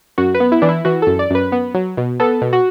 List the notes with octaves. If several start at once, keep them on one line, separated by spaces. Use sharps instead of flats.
F#2 F#4
B4
B3
E4
E3 D4
E4
E3 F#4
F#2 A4
D5
F#2 B4
B3
F#3
B2
B3 A4
B2
F#4